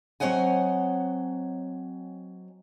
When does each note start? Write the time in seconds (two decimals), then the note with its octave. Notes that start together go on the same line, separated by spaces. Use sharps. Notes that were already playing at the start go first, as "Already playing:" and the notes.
0.20 F#3 C4 C#5 D#5 F#5 G#5